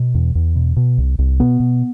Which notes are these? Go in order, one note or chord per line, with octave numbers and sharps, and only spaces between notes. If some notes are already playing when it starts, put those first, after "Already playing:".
Already playing: B2
E2
E2
B2
B2
C2
C2
B2 B3
B2